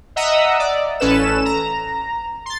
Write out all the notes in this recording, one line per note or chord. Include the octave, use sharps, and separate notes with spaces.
D#5 E5 F#5 A#5 D#6 E6
D5
A1 C#4 A4 B4 E7
A#5
C6 A6